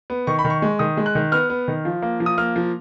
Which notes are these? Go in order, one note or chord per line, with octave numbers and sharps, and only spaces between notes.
B3
D#3 C#6
B5
D#3
C#6
G#3
D#3 D#6
G#3
F#6
D#3
B3 F6
B3
D#3
F3
A#3
F3
D#6
A#3 F6
F3